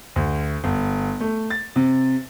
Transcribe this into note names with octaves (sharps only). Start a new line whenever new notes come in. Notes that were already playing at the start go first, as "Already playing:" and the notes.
D2
G1
A3
A6
C3